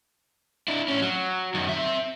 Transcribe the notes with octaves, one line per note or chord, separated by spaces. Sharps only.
D4 E4
A2 C#4
F#3
F#2 D#3
C4 E5